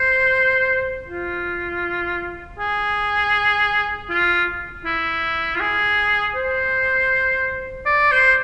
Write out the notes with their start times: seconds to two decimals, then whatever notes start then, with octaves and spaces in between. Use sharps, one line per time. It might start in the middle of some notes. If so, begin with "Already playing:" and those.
Already playing: C5
1.08 F4
2.59 G#4
4.10 F4
4.85 E4
5.55 F4
5.60 G#4
6.35 C5
7.86 D5
8.11 C5